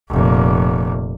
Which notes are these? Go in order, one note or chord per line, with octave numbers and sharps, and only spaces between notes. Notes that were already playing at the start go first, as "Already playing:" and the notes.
F1 A#2